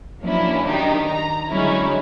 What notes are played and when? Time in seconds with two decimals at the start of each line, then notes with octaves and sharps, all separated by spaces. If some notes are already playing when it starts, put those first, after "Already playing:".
0.22 F3 F#3 A#3 C#4 D4 E4
0.64 D#3 D4 D#4 G4
1.05 A#5
1.49 D3 F#3 G#3 C#4 D#4 E4